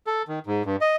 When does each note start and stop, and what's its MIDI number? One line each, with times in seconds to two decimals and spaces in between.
0.07 0.23 69
0.28 0.39 51
0.47 0.63 44
0.66 0.76 43
0.81 0.96 75